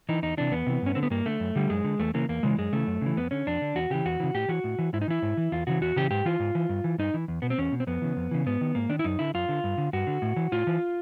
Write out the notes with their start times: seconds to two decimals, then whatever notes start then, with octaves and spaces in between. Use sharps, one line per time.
0.09 E3 D#4
0.23 E2 D#4
0.37 C3 E3 D4
0.52 E2 B3
0.67 C3 E3
0.82 G2 C#4
0.95 D3 C4
1.03 B3
1.10 G2 A#3
1.26 D3 A3
1.40 F#2
1.56 D3 G3
1.70 F#2 G#3
1.84 D3
1.99 E2 A3
2.14 C#3 E3 A#3
2.29 E2 A#3
2.43 C#3 E3 G#3
2.58 F#2 G#3
2.73 C#3 E3 A3
2.87 F#2
3.02 C#3 E3
3.17 F2 B3
3.31 D3 C#4
3.47 F2 D4
3.62 D3
3.75 E2 F#4
3.90 C#3 E3 G4
4.05 E2 F#4
4.20 C#3 E3
4.34 A2 G4
4.48 E3 F#4
4.64 A2
4.79 E3
4.93 G#2 E4
5.02 D#4
5.08 E3 E4
5.22 G#2
5.37 E3
5.52 E2 F4
5.67 C#3 E3 F#4
5.81 E2 F#4
5.96 C#3 E3 G4
6.11 G#2 G4
6.25 E3 F4
6.40 G#2
6.55 E3
6.69 G2
6.84 E3
6.98 G2 D#4
7.14 E3
7.28 E2
7.42 B2 B3
7.50 C4
7.58 E2 C#4
7.72 B2
7.80 C4
7.87 F2 B3
8.02 C#3 E3
8.17 F2
8.31 C#3 E3
8.46 G#2 B3
8.61 D#3
8.75 G#2 A#3
8.89 D#3 D4
8.99 E4
9.04 F#2 D#4
9.19 D3 E4
9.34 F#2 F4
9.49 D3
9.64 G2
9.78 D3
9.93 G2 F#4
10.07 D3
10.22 A2
10.36 E3
10.52 A2 F4
10.67 E3